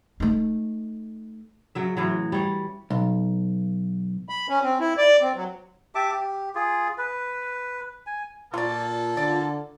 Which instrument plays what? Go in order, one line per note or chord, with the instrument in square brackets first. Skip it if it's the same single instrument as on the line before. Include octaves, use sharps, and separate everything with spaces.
[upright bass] A3 D#4
[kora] C#3 F#3 E5
A2 E3 F#3
G3 C#5
[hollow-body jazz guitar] B1
[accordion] B5
C#4
C4
E4
D5
C4
F#3
[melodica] G4 E5 A5 D6
G4
F4 G#4
B4
G#5
[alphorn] A#2 [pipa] F#3 D5 [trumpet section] A#3 A4 [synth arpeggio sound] F4
[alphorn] D3 [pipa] D5